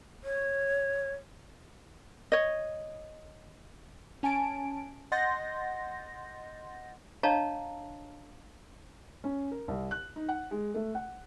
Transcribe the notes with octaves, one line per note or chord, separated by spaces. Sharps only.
C#5
C#5 D#5
C#4 G#5 A5 D7
D#5 F#5 C6 G6 A6 A#6
D4 C#5 D#5 F5 A5 A#5
C#4
A#4
C2
F#6
D#4
F#5
G#3
A3
F#5